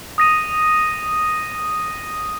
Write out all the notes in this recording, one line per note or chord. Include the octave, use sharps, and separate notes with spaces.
D#6 A#6 D#7